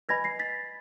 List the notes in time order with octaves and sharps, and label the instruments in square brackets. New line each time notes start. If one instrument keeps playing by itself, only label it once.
[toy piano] B4 D#5 G#5 B5 [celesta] G#6 A#6
[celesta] A#6 C7
A6 B6